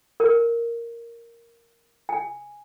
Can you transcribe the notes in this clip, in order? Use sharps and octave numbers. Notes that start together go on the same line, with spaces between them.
A#4
G#5